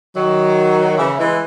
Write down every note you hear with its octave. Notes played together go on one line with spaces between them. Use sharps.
D#3 F#3
C#3 E3
E3 G#3